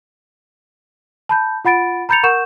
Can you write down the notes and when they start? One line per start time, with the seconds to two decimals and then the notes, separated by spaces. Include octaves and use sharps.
1.29 A5 B5 G6
1.65 F4 F#5 B5 A6 D7
2.09 A#5 B5 G6 A6 C#7 F7
2.23 A#4 F#5 C#6 G6 E7